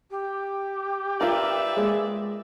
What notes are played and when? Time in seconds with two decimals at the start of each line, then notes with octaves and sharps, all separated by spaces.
0.11 G4
1.21 F4 A#4 B4 D5 E5
1.77 G#3